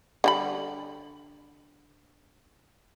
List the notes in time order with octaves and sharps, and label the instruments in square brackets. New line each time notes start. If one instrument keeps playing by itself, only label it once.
[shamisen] D3 G3 B5